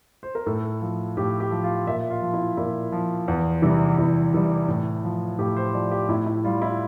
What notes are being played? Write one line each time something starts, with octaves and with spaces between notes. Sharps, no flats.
C5
A#4
A2 A4
F3
A2 G4
G4
F3
F4
A#2 E5
F4
F3
E4
A#2 E4
F3
E2
C3 E3 G3
E2 E4
C3 E3 G3
A2
F3
A2 G4
C5
F3 D5
G4
A2 E4
E4
G3 F4
E4